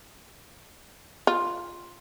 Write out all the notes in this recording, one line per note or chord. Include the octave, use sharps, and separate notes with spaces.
F4